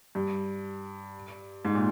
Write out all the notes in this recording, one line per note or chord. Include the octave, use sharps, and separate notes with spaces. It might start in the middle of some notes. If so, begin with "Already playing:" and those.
G2
G#2
A#2